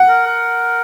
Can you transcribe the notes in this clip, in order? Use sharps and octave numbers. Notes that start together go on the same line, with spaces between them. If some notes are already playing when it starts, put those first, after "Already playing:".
Already playing: F#5
A#4
A#4